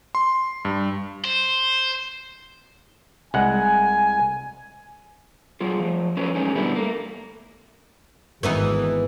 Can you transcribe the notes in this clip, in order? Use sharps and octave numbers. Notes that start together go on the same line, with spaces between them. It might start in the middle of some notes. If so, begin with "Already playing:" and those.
C6
G2
C5
C2 G#3 F#5 G#5
F#3 F4 G#4
F3 A3
F3 F#3 A3 C#4 B4
E3 F#3 G#3 C#4 D#4
B2 D3 G3 B3 E4
A3 A#3
G#1 E3 B3 D#4